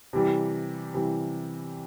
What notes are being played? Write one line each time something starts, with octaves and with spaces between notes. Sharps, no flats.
C3 E3 G3
C3 E3 G3